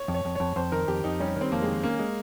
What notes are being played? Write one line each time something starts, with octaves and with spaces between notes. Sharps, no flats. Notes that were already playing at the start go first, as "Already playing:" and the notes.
Already playing: C#5
F2
C#5
F2
F2 C#5
F2 C5
D#3 A#4
F2 G4
F2 D#4
G3 C#4
D#3
C4
F2 A#3
G#3
D#3
A#3 C#4
G#3